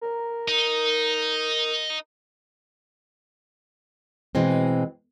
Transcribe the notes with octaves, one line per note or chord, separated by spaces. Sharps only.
A#4
D#4
B2 E3 G#3 C4